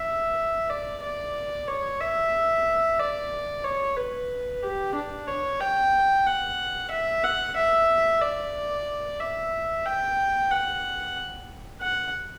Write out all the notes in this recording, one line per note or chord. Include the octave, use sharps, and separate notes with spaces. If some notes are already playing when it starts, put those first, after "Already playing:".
Already playing: E5
D5
D5
C#5
E5
D5
C#5
B4
G4
D4
C#5
G5
F#5
E5
F#5
E5
D5
E5
G5
F#5
F#5